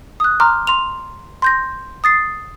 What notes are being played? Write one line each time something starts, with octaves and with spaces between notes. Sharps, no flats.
D#6 F#6
A#5 C6 D6 F6
C6 F7
C6 G6 A#6
D#6 A6 C7